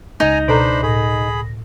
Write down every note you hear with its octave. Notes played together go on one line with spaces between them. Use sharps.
C#2 D#4 G#5 A#5 A#6
B2 D4 A4 C5 A#5 B5
A2 G#4 B5